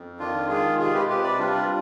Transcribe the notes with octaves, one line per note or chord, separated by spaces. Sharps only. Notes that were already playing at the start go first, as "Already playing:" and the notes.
Already playing: F2
D#3 D4 F4
G#3 F4 G#4
C3 F4 G#4
G4 B4
C3 G4 B4
B4 D5
G3 D4 F4